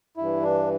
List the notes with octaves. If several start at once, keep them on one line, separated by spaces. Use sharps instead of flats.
G2 E3 E4
D4